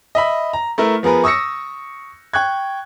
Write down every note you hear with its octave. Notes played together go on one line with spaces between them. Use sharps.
D#5 E5 B5
A#5
A3 E4 A#4 B4
F3 B3 G#4 A#4 B4
C#6 D#6 E6 A#6 C#7
G5 C#6 F#6 G#6